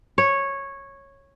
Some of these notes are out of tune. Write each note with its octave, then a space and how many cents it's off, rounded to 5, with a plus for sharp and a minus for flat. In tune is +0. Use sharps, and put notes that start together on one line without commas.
C#5 -10